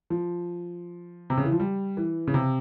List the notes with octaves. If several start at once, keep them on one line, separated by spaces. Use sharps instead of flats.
F3
C3
C#3
E3
F3
G3
E3
C#3
C3